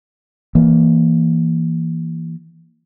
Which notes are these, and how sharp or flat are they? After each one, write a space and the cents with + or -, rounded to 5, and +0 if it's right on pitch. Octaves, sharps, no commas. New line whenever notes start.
E3 +0 A#3 +0